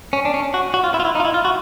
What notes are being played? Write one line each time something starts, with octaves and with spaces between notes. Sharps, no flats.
C#4
D4
C#4
F#4
F#4
F4
E4
F4
E4
D#4
F4
E4
F4
F#4